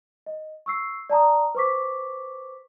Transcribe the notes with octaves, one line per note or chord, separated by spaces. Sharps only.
D#5
C#6 E6 C7
D5 A5 A#5 D#6
B4 C5 C#6 D6 B6